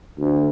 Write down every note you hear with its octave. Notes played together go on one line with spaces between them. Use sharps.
D2